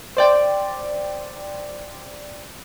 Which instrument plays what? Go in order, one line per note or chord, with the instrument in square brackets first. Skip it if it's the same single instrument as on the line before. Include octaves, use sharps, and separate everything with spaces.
[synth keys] C5 D5 G5